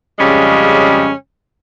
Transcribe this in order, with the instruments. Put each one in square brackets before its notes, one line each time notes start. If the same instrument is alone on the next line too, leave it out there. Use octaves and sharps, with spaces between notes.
[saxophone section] F2 C#3 G3 G#3 C#4